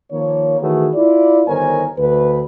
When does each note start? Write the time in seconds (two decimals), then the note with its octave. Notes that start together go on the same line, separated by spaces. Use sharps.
0.12 D#3 F3 A#3 C#5
0.60 D#3 E3 A3 F#4 G#4 B4
0.95 E4 F4 D5
1.47 G1 D#3 A#4 C5 C#5 G#5
1.98 D2 B4